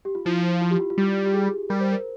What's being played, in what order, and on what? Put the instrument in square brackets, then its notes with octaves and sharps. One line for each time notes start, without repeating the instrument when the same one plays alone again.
[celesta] G4
F4
[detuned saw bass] F3 [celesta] E4
[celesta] F4
G4
F4
F4
[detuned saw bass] G3 [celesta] G4
[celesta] G4
G#4
[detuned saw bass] G3 [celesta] A#4
[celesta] C5
A#4